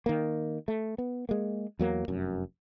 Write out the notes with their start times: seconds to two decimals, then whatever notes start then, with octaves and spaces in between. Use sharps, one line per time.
0.06 D#3 A#3
0.68 A3
0.98 B3
1.29 G#3 A#3
1.79 E2 F#3 A#3
2.08 F1 F#2